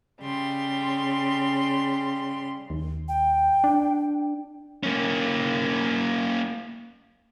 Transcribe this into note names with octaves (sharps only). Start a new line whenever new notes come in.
C#3 G3 C6
D#2
G5
D4
A#3 C#4